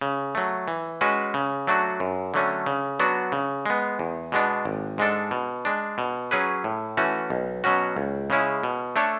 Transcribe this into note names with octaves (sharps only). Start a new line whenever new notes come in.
C#3
F#3 A3
E3
G#3 C#4 F#4 B4
C#3
F#3 A3 D4 F#4
F#2
D3 F#3 A3 C#4
C#3
F#3 B3 D4 F#4
C#3
G#3 B3
E2
B2 G#3 B3 D4
G#1
G#2 G#3 D4 A4
B2
G#3 D4
B2
F#3 C#4 G#4 B4
A2
E3 A3 C#4 F#4
B1
B2 F#3 C#4 F#4
C#2
C#3 G#3 C#4 E4
B2
A3 D4 A4 C#5